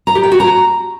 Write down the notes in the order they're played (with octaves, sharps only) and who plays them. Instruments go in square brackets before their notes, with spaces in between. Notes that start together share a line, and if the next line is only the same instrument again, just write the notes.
[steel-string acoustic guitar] A#5
G4
G5
F#4
A#5